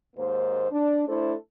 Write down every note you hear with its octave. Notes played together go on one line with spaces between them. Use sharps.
D#2 G#2 A#3 C5
D4
A3 D4 E4 A4 C5